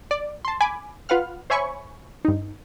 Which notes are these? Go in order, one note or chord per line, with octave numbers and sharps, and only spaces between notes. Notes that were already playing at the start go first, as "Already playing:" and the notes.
D5
A5 C6
G#5 B5 D6
F4 B4 F5 F#5 F6
C5 C#5 E5 G#5 B5 C#6
G2 D#4